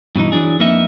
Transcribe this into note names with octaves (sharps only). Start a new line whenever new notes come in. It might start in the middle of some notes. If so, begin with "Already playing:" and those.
G2 B2 E3 D#4
E3 F#3 D4 G#4
F2 A#3 B3 D#4 E5